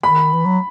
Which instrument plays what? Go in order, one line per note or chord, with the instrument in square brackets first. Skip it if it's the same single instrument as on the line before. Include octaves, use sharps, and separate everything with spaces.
[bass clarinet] D#3 [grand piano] B5
[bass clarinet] E3
F#3